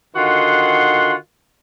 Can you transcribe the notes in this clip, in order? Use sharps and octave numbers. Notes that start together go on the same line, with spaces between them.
D3 D#3 F4 F#4 F#5 C6